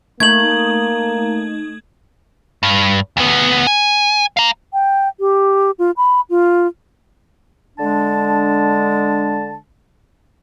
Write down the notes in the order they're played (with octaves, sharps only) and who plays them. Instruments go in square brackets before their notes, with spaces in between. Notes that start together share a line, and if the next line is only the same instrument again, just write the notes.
[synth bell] A3 D#4 [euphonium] A#3 [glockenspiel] G#6 F#7
[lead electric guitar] G2
D2 B3
G#5
F5 A#5
[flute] G5
G4
F4
B5
F4
[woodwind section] D3 G#3 D4 A5